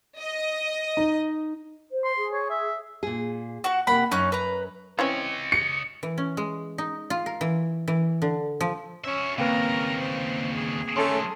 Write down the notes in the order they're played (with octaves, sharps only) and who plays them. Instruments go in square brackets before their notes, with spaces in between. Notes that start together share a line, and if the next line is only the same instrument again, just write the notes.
[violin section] D#5
[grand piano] D#4
[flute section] C5
[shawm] C6
[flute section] G#4
[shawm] C#5
E5
[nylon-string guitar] A#2 G#4
[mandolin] F#4 F#5
[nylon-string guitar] C3 A#3 [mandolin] F#5 B5
[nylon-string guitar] F#2 [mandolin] C#4 D#4 F#6
[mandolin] B4 A#5
[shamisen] E3 C4 C#4 [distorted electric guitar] C#5 D#5
[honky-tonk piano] C#7
[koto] E3
C#4
G#3
D#4
F4
A#4
E3
E3
D3
F3
[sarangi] C#4 [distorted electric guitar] F#4 E5
[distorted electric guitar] D#2 C#3 [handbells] A#3 C4 B4 [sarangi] A#4
[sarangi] C5
G#4
[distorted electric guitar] D#3 F#3 [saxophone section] A3 C#4 [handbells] A5 C6